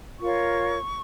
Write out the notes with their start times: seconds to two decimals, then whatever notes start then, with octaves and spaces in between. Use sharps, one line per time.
0.19 F4 A#4 C#5 C#6